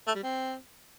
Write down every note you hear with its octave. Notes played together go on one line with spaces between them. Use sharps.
A3
G3
C4